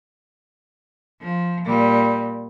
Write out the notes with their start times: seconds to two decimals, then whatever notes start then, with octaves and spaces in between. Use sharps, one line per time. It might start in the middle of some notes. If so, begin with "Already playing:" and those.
1.21 F3
1.65 A#2 G3